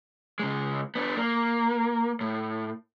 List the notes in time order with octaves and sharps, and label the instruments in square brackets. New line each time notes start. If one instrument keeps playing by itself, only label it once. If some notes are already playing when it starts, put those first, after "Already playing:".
[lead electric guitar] C#3 G#3
B3 D4
A#3
A2